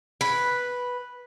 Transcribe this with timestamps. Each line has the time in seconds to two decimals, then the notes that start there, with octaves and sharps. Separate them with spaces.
0.21 B4